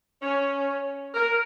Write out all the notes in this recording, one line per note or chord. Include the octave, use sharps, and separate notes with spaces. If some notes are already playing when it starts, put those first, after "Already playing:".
C#4
A#4